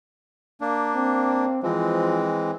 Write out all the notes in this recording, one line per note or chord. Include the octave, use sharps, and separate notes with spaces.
A#3 D4
C4
E3 F3 G#3 C4